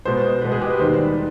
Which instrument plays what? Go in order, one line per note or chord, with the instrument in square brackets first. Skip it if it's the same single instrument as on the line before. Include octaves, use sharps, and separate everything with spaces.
[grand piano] B2 G#3 B3 C5
B2 G#3 B3 B4
G#4
G4
B4
D#2 D#3 G3 B3 C5
D5
B4